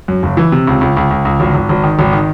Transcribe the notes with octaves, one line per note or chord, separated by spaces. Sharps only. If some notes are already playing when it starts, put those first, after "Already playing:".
F#2
F#1
E3
C3
C#2
C#2
C#2
C#2
C#2
G#1
G#1
G#1
D#3
G#1
D#3